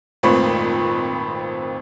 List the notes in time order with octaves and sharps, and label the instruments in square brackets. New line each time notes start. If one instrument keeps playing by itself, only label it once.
[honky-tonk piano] G#1 F2 A#2 A3 C4 B4